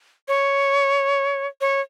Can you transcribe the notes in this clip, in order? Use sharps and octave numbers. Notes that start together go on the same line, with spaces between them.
C#5
C#5